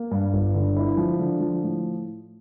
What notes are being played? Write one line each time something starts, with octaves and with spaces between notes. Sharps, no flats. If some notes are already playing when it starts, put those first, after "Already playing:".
Already playing: A#3
G2
G1
D3
E4
F3
D3
F3
A2